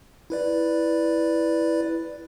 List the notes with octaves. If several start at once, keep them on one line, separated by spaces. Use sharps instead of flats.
E4 B4 D5